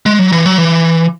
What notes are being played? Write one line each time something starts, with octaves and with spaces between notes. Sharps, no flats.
G#3
F#3
E3
F#3
E3